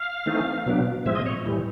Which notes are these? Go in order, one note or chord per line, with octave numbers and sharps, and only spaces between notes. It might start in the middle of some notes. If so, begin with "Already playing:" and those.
Already playing: F5
E3 A3 C4 D#4
B2 F#3 B3 D4
A2 F3 G#3 C4 E5
D#5
C#5
A2 E3 G3